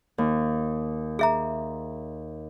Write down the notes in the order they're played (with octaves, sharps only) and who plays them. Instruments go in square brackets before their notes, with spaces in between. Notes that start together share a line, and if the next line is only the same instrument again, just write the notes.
[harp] D#2
[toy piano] G#4 E5 A#5